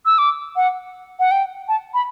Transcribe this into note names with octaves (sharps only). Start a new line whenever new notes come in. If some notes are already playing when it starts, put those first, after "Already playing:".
E6
D6
F#5
F#5
G5
A5
B5